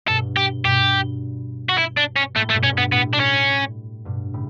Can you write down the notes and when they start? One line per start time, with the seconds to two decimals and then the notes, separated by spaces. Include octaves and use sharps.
0.07 G2 B2 A4
0.37 G4
0.64 G2 B2 G4
1.69 F#4
1.78 E4
1.97 D4
2.16 C#4
2.36 A2 A3
2.50 A3
2.54 G2 B2
2.63 C#4
2.72 G2
2.78 B3
2.92 A2 B3
3.13 D4
3.20 C#4
4.05 G2 B2
4.34 A2 C#3